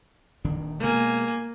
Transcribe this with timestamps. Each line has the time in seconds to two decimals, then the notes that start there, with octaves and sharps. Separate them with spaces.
0.44 D#1 D#3 D4
0.79 B2 G#3 A#3 G#5